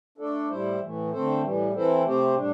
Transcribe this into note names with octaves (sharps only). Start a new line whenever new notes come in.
A3 D4 A4 D5
A2 G3 E4 C5
A2 E3 A3
D3 A3 C4 A4 C5
A2 E3 G3
E3 C4 E4 A4 C5
C3 A3 C4 G4 C5
A2 G3 D4